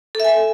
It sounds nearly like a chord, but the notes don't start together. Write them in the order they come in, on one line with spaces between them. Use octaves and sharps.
A4 E5 G#5